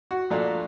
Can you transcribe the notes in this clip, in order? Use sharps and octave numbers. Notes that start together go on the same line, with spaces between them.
F#4
A#2 F3 A3 D4 F4